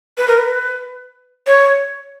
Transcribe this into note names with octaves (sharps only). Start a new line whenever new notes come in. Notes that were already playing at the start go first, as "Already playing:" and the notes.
B4
A#4
B4
C#5